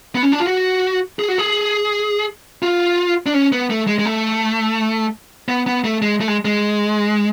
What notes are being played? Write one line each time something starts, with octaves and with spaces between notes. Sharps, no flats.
B3
C#4
D4
F4
F#4
G#4
F#4
G#4
F4
D4
C#4
B3
A3
G#3
G#3
A3
B3
B3
A3
G#3
A3
G#3
G#3